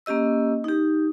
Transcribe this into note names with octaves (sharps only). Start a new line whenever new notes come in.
A#3 C#4 G4 D#5 E6
D#4 G4